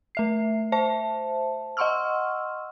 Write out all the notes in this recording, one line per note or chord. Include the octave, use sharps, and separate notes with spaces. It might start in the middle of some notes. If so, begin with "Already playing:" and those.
A3 E5 C7
C5 E5 A5
D#5 F#5 C6 C#6 E6 F6